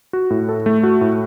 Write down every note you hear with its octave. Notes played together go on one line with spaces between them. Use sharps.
F#4
A2
A4
A3
F#4
A2